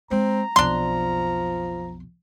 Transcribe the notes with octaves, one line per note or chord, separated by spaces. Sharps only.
G#3 C4 A#5
B1 F2 F3 D4 C6